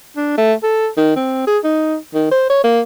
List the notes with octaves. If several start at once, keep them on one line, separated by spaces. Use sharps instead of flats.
D4
A3
A4
D#3
C4
G#4
D#4
D#3
C5
C#5
A#3